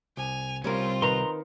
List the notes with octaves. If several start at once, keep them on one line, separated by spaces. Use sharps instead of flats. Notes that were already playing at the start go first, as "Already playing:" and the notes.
C2 G#5 F7
C2 G3 C4 C#4 F4 A#4
D#3 D#4 B4 A#5 C6